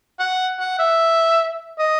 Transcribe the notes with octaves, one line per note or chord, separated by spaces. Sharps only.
F#5
F#5
E5
D#5